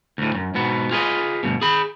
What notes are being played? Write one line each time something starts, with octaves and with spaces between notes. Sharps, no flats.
D2 A2
F#2
G#2 B2 B3
F4 G#4 B4 D#5
D2 G2 B2
G#4 B5